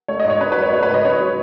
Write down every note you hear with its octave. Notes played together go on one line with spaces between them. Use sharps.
A3 C#5
G#2 D#5
C#5
C#4 B4
B4
F#3
C#5
A3 C#5
B4
G#2
D#5
C#4 C#5
F#3